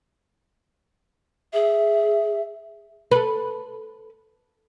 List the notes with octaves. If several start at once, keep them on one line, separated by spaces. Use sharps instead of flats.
G#4 E5
A4 B4